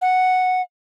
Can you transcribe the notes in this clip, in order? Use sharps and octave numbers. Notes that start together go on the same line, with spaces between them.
F#5